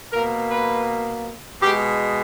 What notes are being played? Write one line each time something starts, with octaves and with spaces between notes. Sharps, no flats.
B2 A#3 A#4
B4
B2 G#3 G4